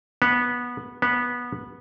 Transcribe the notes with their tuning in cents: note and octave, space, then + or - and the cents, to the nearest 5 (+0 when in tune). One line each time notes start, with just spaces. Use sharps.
B3 -15
B3 -15